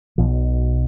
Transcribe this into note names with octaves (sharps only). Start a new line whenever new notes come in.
B1 B2 F3